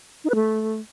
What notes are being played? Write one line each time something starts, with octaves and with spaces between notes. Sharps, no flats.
D#4
B4
A3